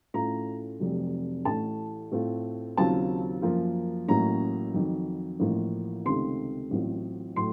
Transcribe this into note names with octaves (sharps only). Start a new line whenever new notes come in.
A2 A3 C#4 F4 A#5
F1 F2 C3 F#3
A1 A2 A3 A5
A2 A3 C4 F4
D#2 C#3 F#3 C4 F4 A5
F#2 F3 A#3 F4
A1 A2 F#3 A#3 C#4 A#5
F2 D#3 F#3
A1 A2 F3 A#3 F4
C#2 C3 D#3 A3 C4 C6
A1 A2 F#3 C4 F4
A2 F#3 A3 C6